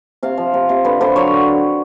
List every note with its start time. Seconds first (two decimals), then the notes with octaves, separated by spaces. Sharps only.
0.23 C3 F5
0.38 F3
0.54 C3
0.69 C3
0.85 D3 B4
1.01 D3 C5
1.16 F#3 C#5